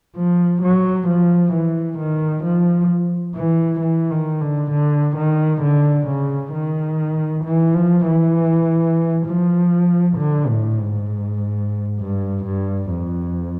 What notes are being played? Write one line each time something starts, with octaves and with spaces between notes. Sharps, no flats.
F3
F#3
F3
E3
D#3
F3
E3
E3
D#3
D3
D3
D#3
D3
C#3
D#3
E3
F3
E3
F3
D3
A2
G#2
G2
G2
F2